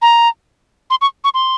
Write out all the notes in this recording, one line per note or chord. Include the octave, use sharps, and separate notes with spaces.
A#5
C6
C#6
C#6
C6